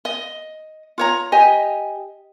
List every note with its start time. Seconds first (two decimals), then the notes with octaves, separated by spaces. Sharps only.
0.05 D#5
0.98 F4 C#5 A#5
1.32 G4 D#5 G#5